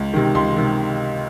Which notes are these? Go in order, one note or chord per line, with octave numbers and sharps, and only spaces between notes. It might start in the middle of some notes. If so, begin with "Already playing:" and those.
Already playing: C#2
C3 D#3
C#2 C6
C3 D#3